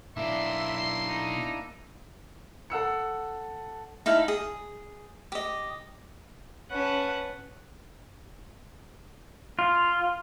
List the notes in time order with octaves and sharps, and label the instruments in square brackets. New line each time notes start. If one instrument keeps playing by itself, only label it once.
[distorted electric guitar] B1 D5 [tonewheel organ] A#3 D4 E4 [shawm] E5 [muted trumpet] C6
[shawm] D#4
[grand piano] A4 F#5 E6 C#7
[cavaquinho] D#4 E4 F5 A5
G#4
G4 D#5
[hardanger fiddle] C#4 B4 [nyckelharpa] F#5 A5
[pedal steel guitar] F4